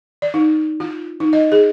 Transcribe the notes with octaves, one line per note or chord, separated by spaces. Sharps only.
D5
D#4
F4
D#4
D#5
G#4